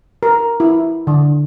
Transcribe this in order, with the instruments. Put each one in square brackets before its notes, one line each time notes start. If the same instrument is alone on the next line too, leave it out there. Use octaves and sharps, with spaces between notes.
[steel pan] A#4
E4
D3